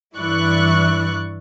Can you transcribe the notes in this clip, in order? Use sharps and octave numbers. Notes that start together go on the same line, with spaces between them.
G2 E3 E4 D5 C#6 F#6